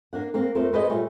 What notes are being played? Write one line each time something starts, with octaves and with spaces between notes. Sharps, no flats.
A#3 D4 F#5
A#3 C4 A#4
F2 A3 A#4 C5
F#4 G#4 B4 C5 D5 D#5
A#2 G3 A3 G#4 C#5